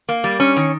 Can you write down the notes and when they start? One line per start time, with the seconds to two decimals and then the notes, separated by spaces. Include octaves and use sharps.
0.09 A#3
0.24 G3
0.40 C#4
0.56 D#3